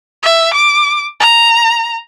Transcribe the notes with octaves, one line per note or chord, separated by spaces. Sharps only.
E5
D6
A#5